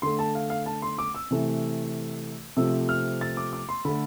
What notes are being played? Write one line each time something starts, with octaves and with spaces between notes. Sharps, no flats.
D3 A3 C6
A5
F5
F5
A5
C6
D6
E6
C3 E3 A3
C3 F3 A3 E6
F6
A6
D6
D6
C6
D3 A3 B5